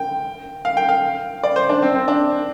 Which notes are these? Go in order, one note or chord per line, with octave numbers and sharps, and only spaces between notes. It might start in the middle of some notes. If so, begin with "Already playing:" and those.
Already playing: G5
F5
G5
F5
D5
C5
D4
C4
C4
D4